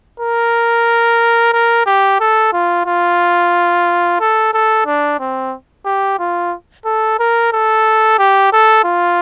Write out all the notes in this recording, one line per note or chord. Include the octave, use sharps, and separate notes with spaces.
A#4
A#4
G4
A4
F4
F4
A4
A4
D4
C4
G4
F4
A4
A#4
A4
G4
A4
F4